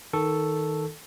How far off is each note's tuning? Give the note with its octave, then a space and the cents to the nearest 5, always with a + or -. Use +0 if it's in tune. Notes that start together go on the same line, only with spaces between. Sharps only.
D#3 +15 A4 +0 C#6 +0